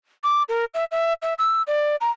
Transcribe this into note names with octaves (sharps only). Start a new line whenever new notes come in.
D6
A#4
E5
E5
E5
E6
D5
A#5